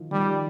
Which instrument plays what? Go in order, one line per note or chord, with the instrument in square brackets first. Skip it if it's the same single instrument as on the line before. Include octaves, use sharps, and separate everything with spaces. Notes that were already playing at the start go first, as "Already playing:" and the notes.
Already playing: [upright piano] D#3 F3
[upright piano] D#3 [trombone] G3